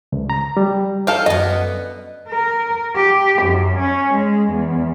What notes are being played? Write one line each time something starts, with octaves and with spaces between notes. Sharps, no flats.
C#2
A#5
G3
A4 D#5 F5 G5
F#2 D3 B3 D#5
A#4
G4
F#2
C#4
G#3
E2